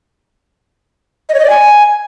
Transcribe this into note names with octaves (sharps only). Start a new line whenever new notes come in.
D#5
C#5
D#5
D5
G#5